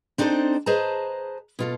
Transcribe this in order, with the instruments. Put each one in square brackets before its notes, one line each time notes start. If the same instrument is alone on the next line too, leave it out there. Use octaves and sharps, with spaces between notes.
[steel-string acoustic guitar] C4 D4 D#4 A4 B4 C5
G#4 B4 C5 D#5 A5 A#5
B2 F4 A4